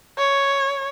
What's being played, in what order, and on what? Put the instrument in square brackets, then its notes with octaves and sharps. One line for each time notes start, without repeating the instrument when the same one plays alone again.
[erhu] C#5